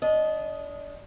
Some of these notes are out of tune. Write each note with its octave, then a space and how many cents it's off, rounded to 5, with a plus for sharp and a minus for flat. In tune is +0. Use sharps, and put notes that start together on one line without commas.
D4 -30 D#5 +0